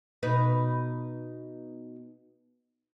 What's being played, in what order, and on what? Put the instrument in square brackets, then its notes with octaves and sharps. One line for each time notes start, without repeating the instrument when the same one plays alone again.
[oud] B2 D#4 B4